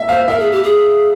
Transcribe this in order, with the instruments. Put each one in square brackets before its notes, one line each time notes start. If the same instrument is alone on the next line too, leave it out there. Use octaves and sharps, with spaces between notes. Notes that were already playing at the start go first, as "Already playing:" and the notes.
Already playing: [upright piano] E5
[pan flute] C5 [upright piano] F5
[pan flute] A#4 [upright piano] E5
[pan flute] G#4
G4
G#4